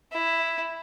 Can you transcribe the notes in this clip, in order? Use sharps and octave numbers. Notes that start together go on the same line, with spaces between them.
E4